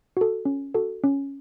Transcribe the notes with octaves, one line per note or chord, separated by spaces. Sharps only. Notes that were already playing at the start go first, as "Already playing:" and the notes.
F#4 A4
C#4
F#4 A4
C#4